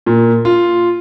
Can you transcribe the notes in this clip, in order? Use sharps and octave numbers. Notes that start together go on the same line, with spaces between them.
A#2
F4